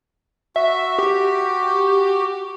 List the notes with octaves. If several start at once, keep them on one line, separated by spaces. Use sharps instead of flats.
F#4 E5
G4